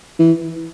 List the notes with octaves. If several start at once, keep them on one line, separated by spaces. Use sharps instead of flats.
E3